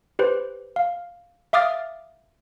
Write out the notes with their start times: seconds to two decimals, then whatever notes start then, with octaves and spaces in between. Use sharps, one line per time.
0.19 G4 B4 C5
0.76 F5
1.53 E5 F5 D6 D#6 F6 A6